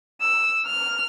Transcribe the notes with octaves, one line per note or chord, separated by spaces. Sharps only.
E6
F6